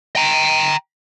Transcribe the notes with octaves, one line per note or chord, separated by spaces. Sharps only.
G5 A#5